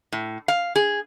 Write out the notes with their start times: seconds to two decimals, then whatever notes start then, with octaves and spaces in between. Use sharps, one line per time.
0.12 A2
0.48 F5
0.76 G#4